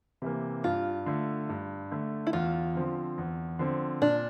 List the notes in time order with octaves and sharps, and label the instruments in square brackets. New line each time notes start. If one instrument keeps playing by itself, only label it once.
[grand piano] C3 E3 A#3
[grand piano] G2 [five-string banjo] F4
[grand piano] D3 A3
G2
D3 A3
[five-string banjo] E4
[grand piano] E2 [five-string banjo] F4
[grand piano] D3 F3 C4
E2
D3 F3 C4
[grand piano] A#2 [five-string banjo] D4